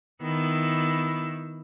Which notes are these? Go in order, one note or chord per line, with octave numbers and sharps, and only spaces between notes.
D#3 B3 E4